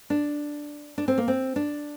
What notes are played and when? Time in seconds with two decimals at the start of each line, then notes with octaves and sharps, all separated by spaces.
0.10 D4
0.98 D4
1.08 C4
1.18 A#3
1.28 C4
1.56 D4